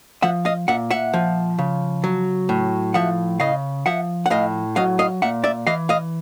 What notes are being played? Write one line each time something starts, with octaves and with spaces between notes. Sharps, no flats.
F3 E5 F#5
D#5 F5
A#2 E5 F#5
E5 F#5
F3
C#3
F#3
A2
F3 E5 F#5
C#3 D#5 F5
F3 E5 F#5
F#5
A2 D#5 F5
F#3 D#5 F5
D#5 F5
A#2 E5 F#5
D5 E5
E3 D#5 F5
D#5 F5